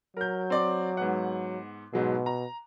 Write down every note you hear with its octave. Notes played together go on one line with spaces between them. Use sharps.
F#3 A#4 G6
C4 D5 D6
G#2 B3 F#5
G#2 B2 F#3 G#3
A#5